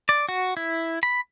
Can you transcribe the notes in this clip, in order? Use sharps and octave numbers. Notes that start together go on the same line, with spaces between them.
D5
F#4
E4
B5